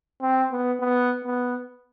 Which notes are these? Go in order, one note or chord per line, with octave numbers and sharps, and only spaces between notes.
C4
B3
B3
B3